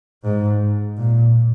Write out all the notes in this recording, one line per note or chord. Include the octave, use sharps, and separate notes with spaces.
G#2
A#2